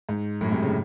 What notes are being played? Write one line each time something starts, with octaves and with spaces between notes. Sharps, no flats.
G#2
F#2 A2
G#2 C3
A2 C#3